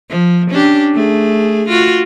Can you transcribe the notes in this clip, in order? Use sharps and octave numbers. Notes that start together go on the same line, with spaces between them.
F3
C#4 D4 G4
A3 G#4
F4 F#4